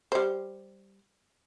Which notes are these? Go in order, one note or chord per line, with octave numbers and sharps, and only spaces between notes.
G3 C5